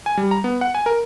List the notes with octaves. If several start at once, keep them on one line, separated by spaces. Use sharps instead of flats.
G#5
G3
A#5
B3
F#5
G#5
A#4